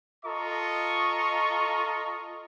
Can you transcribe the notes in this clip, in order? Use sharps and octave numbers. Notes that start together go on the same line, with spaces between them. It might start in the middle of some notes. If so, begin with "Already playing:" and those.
F4 A4 D#5 A#5 C#6